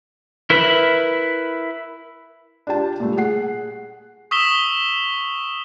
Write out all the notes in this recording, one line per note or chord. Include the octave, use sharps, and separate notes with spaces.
E4 A#4 B4 E5 B5
D4 F4 G4 A5
A#2 G3 A3
G#4 F#5 C7
C#6 D#6 E6 B6 E7 G7